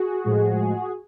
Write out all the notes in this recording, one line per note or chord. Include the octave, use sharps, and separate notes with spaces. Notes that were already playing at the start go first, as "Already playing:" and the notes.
Already playing: F#4 G#4
A2 F3 G#3